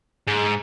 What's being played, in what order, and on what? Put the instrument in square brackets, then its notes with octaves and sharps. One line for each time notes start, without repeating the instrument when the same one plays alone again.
[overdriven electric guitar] G#2